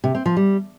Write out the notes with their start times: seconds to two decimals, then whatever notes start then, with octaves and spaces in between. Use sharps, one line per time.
0.04 C3
0.15 C4
0.26 F3
0.36 G3